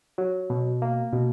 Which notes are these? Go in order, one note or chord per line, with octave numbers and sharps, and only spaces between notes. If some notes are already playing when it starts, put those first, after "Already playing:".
F#3
B2
A#3
B2